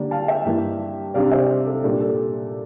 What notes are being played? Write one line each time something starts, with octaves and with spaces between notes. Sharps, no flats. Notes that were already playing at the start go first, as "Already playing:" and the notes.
Already playing: D3 G3 A#3 D4
F5 A5
E5 G5
G2 E3 A#3
C3 G3 D4 D5 F5
C5 E5
A4
A#2 G3 D4 A4
A4